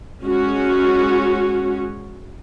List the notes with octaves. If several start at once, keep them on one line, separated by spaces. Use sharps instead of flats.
G#3 C#4 F#4